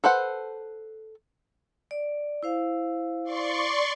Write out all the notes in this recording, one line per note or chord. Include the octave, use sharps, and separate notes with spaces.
A4 B4 C5 F#5
D5
E4 C5 F5
D5 C6 C#6